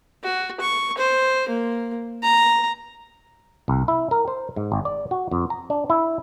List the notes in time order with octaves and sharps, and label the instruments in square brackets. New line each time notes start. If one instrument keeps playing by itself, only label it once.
[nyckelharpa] F#4
C#6
C5
A#3
A#5
[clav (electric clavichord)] C2
E4
A#4
C5
G#2
G#1
D5
F#4
F2
A#5
D4
E4